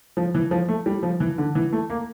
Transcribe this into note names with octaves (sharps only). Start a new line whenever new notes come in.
F3
E3
F3
A3
G3
F3
E3
D3
E3
A3
A#3